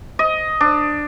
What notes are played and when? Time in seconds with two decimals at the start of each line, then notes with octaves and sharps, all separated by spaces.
0.19 D#5
0.61 D4